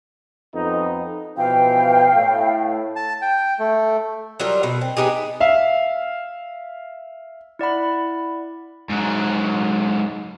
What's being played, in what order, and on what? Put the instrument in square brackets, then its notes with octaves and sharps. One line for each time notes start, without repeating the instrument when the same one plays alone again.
[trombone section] F2 B3 D#4
[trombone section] B2 E3 F3 [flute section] F5 G5
[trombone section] A2
[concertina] A5
G5
A3
[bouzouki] F#3 G3 F4 A#4
B2
C4
B3 D#4 G4 G#4
[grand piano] E5 F5
[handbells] E4 D5 F#5 B5
[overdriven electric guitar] G#2 F#3